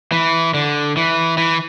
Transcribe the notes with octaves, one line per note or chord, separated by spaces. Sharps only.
E3
D3
E3
E3